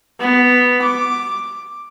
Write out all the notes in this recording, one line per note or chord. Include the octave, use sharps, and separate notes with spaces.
B3
D6